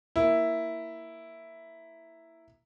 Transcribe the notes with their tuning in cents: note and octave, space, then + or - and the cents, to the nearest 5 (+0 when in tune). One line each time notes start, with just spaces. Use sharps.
A#3 +0 E4 +0